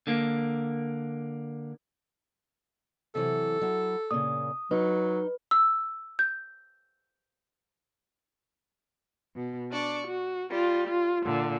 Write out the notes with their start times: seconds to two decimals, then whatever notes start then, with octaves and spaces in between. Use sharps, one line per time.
0.07 D3 A#3
3.15 C3 E3 F#3 A4
3.61 F#3 E4
4.11 A#2 C#3 D#6
4.71 F#3 D#4 B4
5.51 E6
6.19 G6
9.35 B2
9.71 D4 D5 C#6
10.06 F#4
10.50 G3 F4
10.86 F4
11.25 A#2 D3